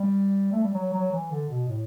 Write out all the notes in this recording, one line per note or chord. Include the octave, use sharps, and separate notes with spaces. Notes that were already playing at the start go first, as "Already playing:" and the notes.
Already playing: G3
A3
G3
F#3
F#3
E3
D3
B2
A2